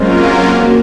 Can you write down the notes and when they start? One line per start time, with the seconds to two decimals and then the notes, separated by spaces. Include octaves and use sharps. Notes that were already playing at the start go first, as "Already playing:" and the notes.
Already playing: F#3 G#3 A#3 C4 C#4 F4 A#4
0.61 F#3 A#3